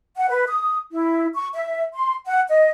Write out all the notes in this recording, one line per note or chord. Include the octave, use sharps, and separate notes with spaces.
F#5
B4
D#6
E4
C#6
E5
C6
F#5
D#5